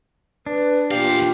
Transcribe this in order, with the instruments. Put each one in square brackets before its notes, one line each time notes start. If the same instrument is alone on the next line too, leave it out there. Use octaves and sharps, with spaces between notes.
[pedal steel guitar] D4 [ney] B4
[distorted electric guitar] E2 F5 [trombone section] A#2 G4 [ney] F4